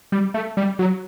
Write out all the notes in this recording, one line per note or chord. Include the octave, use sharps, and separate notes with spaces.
G3
A3
G3
F#3